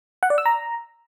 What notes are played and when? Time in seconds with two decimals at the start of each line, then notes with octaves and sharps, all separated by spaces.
0.23 F#5
0.30 D5
0.38 E6
0.46 A#5